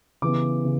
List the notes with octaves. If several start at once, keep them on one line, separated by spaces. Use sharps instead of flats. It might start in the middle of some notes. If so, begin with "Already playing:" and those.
C#3 E3 B3 D6
C#3